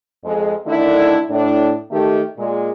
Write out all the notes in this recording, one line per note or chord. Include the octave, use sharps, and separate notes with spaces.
F2 G#3
D3 D#3 A3 D4 E4
A2 D4
D#3 A3 G4
A#2 G#3